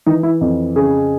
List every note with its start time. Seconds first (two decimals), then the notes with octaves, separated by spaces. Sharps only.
0.06 E3 D#4
0.23 E4
0.41 F2
0.76 C#3 G#4